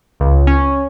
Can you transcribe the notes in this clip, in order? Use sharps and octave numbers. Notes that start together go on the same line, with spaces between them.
C#2
C#4